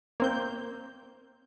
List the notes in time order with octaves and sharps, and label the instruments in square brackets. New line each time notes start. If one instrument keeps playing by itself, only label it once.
[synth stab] A#3 C4 G6